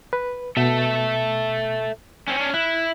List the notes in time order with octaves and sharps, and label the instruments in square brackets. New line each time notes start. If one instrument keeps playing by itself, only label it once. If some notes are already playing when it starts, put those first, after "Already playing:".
[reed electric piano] B4
[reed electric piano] B2 [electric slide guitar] A4 E5
[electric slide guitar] C4 C#4
C#4 D4
[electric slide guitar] E4 [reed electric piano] F#6